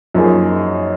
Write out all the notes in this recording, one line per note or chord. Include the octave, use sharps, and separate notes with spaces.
F#2 F3 A#3 D#4 G#4